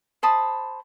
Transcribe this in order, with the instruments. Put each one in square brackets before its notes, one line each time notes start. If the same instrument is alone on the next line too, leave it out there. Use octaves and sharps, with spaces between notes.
[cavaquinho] C5 A5 B5 D#6